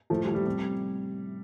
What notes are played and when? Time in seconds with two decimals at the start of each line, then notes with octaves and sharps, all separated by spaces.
0.10 A2 F3 A3
0.23 G3
0.28 F3
0.34 G3
0.46 C3 G3